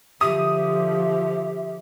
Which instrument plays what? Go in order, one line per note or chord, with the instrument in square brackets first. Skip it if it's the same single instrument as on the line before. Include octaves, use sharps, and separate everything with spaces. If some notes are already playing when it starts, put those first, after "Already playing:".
[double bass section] D3 F3 [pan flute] G4 [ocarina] E5 [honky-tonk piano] D#6